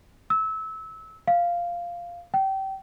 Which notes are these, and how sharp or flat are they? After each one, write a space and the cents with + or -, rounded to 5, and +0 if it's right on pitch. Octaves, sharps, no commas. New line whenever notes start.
E6 -25
F5 -5
G5 -25